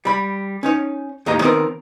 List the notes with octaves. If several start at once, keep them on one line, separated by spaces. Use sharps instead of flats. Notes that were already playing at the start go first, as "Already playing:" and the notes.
G3 B5
C#4 D#4 C#5
D#2 A2 G4 D#5 A#5
D#3 B3 C4 A#4